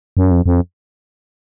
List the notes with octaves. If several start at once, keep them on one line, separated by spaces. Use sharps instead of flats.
F#2
F2
F2